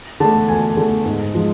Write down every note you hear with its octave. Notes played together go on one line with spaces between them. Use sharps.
D3 A3 A5
D2 G#5
D3 A3
G#2
F3 G#3